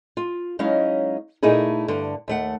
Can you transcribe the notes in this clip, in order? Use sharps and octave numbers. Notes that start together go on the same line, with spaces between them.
F4
F#3 G#3 C#4 D#4 E4 F5
A#2 A3 D#4 E4 G#4
G2 D3
D#2 A3 F#5